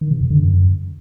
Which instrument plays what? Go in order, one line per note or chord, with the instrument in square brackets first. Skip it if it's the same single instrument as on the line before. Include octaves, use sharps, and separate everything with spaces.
[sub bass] D#3
C3
F2
D3
F#2